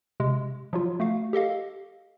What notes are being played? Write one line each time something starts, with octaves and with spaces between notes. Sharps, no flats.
C3 G#3
F3 F#3 F4
A3 F#4 F5
G4 A4 D#5 F5